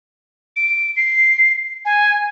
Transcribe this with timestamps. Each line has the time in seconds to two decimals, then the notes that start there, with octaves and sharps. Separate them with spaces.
0.56 D7
0.97 C7
1.85 G#5